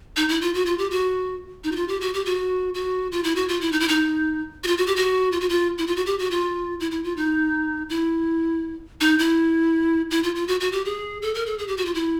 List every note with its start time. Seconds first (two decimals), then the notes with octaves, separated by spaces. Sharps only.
0.17 D#4
0.29 E4
0.41 F4
0.54 F#4
0.66 F4
0.78 G4
0.91 F#4
1.64 D#4
1.72 F#4
1.76 F4
1.88 G4
2.01 F#4
2.14 G4
2.26 F#4
2.74 F#4
3.12 F4
3.24 E4
3.36 F#4
3.48 F4
3.61 E4
3.72 D#4
3.80 E4
3.88 D#4
4.64 F#4
4.67 F4
4.77 F#4
4.87 G4
4.96 F#4
5.32 F4
5.41 F#4
5.49 F4
5.78 E4
5.87 F4
5.96 F#4
6.06 G4
6.19 F#4
6.31 F4
6.80 E4
6.91 E4
7.04 F4
7.17 D#4
7.90 E4
9.01 D#4
9.19 E4
10.11 E4
10.23 F4
10.35 F4
10.48 F#4
10.60 F#4
10.72 G4
10.85 G#4
11.22 A4
11.34 A#4
11.46 A4
11.58 G#4
11.68 G4
11.77 F#4
11.85 F4
11.95 E4